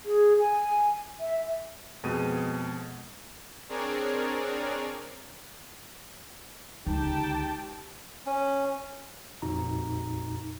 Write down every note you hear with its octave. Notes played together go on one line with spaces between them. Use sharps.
G#4
G#5
E5
F2 B2 G#3 G#4 D#7
C4 D4 G#4 A#4 C#5 D5
C#2 D3 D#4 G4 G5 A5
C#4
A1 F2 A#2 D#4 F#4 A#5